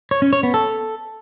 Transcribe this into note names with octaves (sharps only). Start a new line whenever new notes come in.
C#5
C#4
C#5
B3
A4